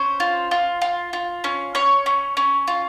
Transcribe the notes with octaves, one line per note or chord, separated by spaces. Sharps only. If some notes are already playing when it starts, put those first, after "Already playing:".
Already playing: C#4 C5
F4
F4
F4
F4
C#4
C#4 C#5
C#4
C#4
F4